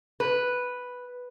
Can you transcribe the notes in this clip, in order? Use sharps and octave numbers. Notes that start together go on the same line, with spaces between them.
B4